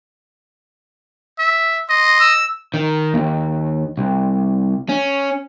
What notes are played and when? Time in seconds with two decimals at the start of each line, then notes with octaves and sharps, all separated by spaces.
1.39 E5
1.90 D#5 C6
2.20 E6
2.74 D#3
3.14 D#2
3.97 C2
4.89 C#4